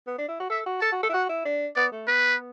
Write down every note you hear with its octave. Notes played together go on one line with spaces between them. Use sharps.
B3
D4
E4
F#4
A4 E5
F#4
A4 A5
F#4
A4
E4
F#4 F#5
E4
D4
B3 D5
A3
B3 B4